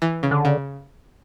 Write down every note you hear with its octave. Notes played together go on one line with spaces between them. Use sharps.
E3
C#3
D3
C#3